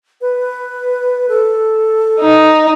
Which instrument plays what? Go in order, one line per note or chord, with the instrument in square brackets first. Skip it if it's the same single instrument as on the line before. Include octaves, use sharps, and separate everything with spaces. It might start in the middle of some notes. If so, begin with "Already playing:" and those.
[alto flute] B4
A4
[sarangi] D#4